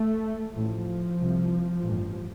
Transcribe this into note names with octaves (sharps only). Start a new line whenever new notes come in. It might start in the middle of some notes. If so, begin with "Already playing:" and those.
Already playing: A3
A1 A2 F3
C2 C3
A1 G2